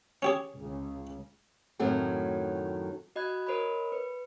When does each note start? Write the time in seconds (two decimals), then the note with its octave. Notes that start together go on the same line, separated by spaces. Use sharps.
0.22 C#4 G4 G#4
0.57 C#2 C#3
1.79 F#2 A2 D#3 F#3 A3 C4
3.16 F#4 D#5 B5 F#6 G#6
3.47 A#4 C5 C#5 D#5 B5
3.92 B4